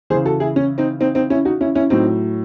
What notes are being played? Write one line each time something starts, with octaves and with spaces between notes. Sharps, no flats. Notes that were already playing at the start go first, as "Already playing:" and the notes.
C#3 E3 G#4 C5
F#4 A4
E4 G#4
C#4
C4 D#4
C4 D#4
C4 D#4
C#4 E4
D#4 F#4
C#4 E4
C#4 E4
A2 F#3 C4 D#4